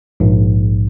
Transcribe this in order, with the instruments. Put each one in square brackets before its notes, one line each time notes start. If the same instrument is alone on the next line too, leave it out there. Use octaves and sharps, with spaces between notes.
[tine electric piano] A#1 G#2